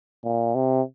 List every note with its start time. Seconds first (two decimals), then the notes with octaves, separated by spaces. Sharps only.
0.24 A#2
0.55 C3